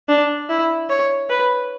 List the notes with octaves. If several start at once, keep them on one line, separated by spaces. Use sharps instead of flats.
D4
E4
C#5
B4